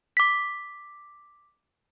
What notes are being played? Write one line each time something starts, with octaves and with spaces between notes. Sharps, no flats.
D6 B6